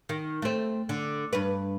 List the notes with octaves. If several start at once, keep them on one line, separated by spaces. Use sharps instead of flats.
D#3
A3 C4
D3
G2 B4